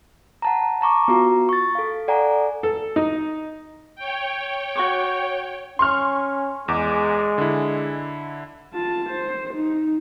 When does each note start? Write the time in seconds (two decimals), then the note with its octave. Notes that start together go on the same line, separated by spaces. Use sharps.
0.42 F#5 A5 A#5
0.81 A5 A#5 C#6 D6
1.08 B3 F4 F#4 A#5
1.49 C#6 A6
1.75 A4 F5
2.08 A4 D5 F#5 G#5 A#5
2.63 A4
2.96 D#4
3.96 C#5 G5
4.75 F#4 C#6 D6
5.79 C#4 C6 C#6 F6
6.68 E2 G#3 D6
7.38 D3 E4
8.74 F4 A5
9.10 C5
9.54 D#4